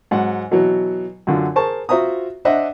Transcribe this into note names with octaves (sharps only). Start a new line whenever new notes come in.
G#2 F#3 F#5
B2 E3 F#3
F#2 D3 F4
G#4 A#4 C5 A5 C#6
F4 F#4 C5 E5 A#5 D#6
D4 C5 D#5 E5 F#5